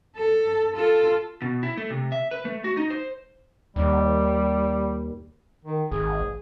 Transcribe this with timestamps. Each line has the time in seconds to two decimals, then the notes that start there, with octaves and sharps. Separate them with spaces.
0.16 A4
0.75 F4 A4
1.42 B2
1.63 E4
1.77 A3
1.90 C3
2.12 E5
2.31 B4
2.45 A3
2.64 F#4
2.77 D#4
2.90 C5
3.76 D#2 G3
5.65 D#3
5.92 G#1 G#4